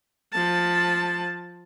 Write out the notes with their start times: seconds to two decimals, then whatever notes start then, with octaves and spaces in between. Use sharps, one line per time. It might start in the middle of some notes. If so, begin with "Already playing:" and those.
0.33 F3 A5